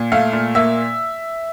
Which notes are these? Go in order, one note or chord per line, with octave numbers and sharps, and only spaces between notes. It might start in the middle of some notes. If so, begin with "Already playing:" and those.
Already playing: A#2
A3 F5
A#2
A#3 E5